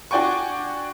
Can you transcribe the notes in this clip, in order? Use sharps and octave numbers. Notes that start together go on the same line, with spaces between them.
D4 F#4 D5 G5 G#5 C#6